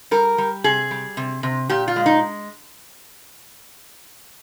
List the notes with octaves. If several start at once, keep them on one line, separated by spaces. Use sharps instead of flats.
G3 A#4
G3
C3 G#4
G3
C3
C3
A#2 G4
F4
G#3
D#4